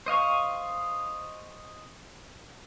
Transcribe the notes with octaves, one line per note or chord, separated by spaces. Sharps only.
C5 D#5 F5 C#6